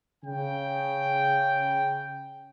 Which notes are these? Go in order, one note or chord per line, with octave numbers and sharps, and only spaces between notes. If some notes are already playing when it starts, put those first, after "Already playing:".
C#3 G5